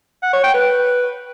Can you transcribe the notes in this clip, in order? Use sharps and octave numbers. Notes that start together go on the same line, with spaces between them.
F#5
C#5
G5
B4